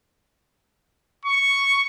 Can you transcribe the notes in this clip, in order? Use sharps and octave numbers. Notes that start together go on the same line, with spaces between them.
C#6